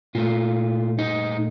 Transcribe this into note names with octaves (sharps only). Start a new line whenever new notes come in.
A#2 A3 F4
D#4